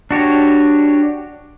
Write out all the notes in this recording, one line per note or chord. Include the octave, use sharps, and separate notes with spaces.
D4 F#4 G4 C#5